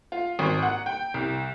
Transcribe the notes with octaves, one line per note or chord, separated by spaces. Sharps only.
F4
G#1
F#5
G5
C2